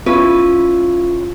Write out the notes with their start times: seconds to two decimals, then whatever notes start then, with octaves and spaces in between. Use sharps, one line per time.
0.06 C#4 E4 F4 B4